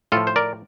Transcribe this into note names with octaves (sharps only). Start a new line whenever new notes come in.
A2 F3 F4 A4
C5
A#4 D5